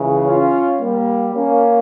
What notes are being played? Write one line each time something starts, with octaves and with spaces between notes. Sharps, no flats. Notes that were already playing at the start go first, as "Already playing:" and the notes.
Already playing: C#2 C#3 E3
C#4 F4
G3 A#3
A#3 C#4